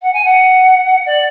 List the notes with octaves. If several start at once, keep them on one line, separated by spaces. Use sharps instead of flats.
F#5
G#5
F#5
D5